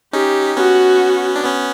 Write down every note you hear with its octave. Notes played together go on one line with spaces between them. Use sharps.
C#4 D#4 G4
B3 C#4 F#4
D4
B3 C#4